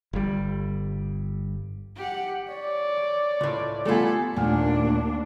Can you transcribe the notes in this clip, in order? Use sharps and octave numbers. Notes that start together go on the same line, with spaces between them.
G1 G3
G4 F#5
C#5 D5
D6
C#2 A2
G3 A3 B3 F4 A4 G#5
D#2 A#2 A3 A#3 D4 G#5